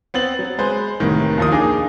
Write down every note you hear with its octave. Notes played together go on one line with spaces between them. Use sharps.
B3 C4 A6 F#7
F#3
G#3 B4 C5
C2 A2 D#3
D#2 D#3 F3 C4 D#6
D4 D#4 G#4 F5 D6